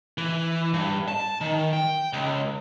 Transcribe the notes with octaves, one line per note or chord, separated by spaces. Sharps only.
E3
G2
A5
D#3
G5
C#2